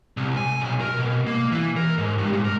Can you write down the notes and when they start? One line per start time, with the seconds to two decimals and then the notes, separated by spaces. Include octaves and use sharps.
0.17 C2
0.37 G#5
0.60 B1
0.81 A#4
0.99 B2
1.27 A#3
1.52 E3
1.77 A#4
1.98 G#2
2.18 G2
2.32 G#2
2.45 A#4